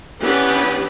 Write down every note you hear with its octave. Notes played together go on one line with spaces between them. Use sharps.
E3 B3 C#4 D4 G4 B4